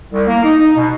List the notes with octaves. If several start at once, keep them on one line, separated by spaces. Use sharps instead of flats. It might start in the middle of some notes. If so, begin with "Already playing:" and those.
C2
A#3
D#4
D#4
B2